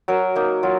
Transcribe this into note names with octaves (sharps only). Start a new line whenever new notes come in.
F#3 A#4
A#3 D#4
F#3 F4